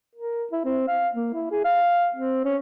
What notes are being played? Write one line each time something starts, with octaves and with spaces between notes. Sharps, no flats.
A#4
E4
C4
F5
A#3
E4
G#4
F5
C4
C#4